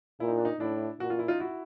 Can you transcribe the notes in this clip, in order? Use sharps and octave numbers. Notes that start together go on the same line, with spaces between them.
A#2 E4
D#4
D4
D#4
A2 D4 E4
A#2 F#4
F4
E4
D#4 F4
E4 F#4